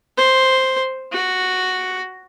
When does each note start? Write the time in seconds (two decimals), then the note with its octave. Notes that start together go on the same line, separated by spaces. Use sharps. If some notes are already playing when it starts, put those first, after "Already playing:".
0.17 C5
1.12 F#4